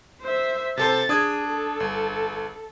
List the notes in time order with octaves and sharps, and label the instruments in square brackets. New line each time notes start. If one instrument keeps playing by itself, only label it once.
[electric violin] C5 E5
[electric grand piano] C3 A4 C5 [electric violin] A6
[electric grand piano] D4 D#6 G#6 [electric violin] G#4
[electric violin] A4
[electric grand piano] G1